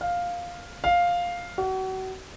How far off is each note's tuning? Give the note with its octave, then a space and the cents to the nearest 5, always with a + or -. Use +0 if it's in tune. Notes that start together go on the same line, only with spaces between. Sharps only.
F5 +5
F5 +5
F#4 +35